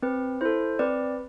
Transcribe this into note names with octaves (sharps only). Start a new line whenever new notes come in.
C4 B4
E4 A4 C5
C4 B4 D5